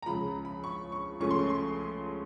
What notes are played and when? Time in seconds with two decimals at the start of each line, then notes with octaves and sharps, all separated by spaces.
0.02 A#5
0.06 C#2 C#3 F3 B5
0.45 B5
0.64 C#6
0.92 C#6
1.20 C#2 C#3 F3 A3 C#4 C#6
1.31 C6
1.39 C#6
1.50 C6